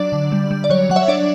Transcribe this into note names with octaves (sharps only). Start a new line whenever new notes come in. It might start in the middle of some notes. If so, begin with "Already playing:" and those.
Already playing: F#3 D4 D5
D3
G3
G3
D5
F#3 C#5
F#3 F#5
C#5 E5
D4 D5